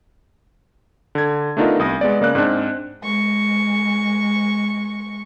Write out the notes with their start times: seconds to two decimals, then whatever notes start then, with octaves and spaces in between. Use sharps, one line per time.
1.15 D3 G#6
1.57 A3 B3 D4 D#4 F4 A#4
1.79 C2 D#6 A#6
2.01 G#3 B3 D5
2.21 C#3 A#3 D5 F#6
2.35 G#2 C4 D4
3.02 G#3 C#6